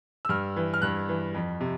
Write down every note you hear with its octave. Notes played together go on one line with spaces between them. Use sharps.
E6
G2 F6
E3
F6
G2 F#6
E3
F2
C3